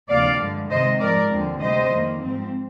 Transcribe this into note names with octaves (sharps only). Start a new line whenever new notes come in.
D2 C3 F3 A#3 D5 F5
G2 D3 G#3
C3 D#3 G#3 C4 C5 D#5
G#2 F3 G#3 A#4 D5
D#2 D3 F3 G#3 C4
D2 C3 G3 C4 C5 D#5
F2 D#3 A#3
G#2 F3 C4